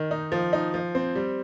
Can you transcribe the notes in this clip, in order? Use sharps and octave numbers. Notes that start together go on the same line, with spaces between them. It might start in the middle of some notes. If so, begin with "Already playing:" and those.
Already playing: D#3
D#4
F3
D#4
F3
C4
G3